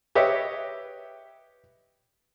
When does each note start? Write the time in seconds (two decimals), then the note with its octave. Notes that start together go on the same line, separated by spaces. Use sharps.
0.15 G4 B4 C#5 D#5 E5